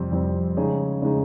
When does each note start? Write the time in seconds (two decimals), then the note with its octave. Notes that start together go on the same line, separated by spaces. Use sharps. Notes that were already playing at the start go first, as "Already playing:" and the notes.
Already playing: F2 C3 G3 C4
0.12 F2 C3 G3 C4
0.57 C#3 G#3 D#4 G#4
1.02 C#3 G#3 D#4 G#4